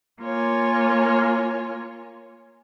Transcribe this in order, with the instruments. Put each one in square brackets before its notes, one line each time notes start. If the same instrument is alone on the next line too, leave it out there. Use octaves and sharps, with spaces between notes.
[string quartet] A#3 F4 C#5 G#5